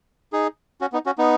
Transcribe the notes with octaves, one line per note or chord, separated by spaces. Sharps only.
D#4 G#4
C#4 F#4
B3 D#4
C#4 F#4
B3 D#4